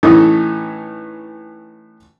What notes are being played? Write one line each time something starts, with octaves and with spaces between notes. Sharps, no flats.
A2 E3 C#4 D#4 A4 D#6